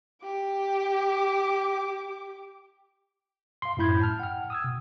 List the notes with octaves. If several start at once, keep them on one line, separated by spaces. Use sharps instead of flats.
G4 D6
F5 C6
F#2 A2 E4 B5 G6 G#6
A5 F6
F#5 G5 F6
D#6 E6 G#6
B2